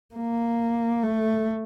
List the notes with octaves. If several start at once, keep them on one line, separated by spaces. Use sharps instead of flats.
A#3
A3